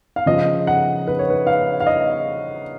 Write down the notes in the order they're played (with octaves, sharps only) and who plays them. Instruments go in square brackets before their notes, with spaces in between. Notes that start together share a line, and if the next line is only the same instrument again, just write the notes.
[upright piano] F5
C#3 F3 D#5
F#5
B4
C#5
B4
F5
F5
D#5